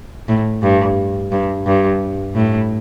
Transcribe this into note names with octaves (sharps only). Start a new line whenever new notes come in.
A2
G2
G2
G2
A2